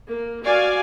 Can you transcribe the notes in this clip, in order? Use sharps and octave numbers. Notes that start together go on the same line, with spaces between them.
A#3
F#4 D5 F5 G#5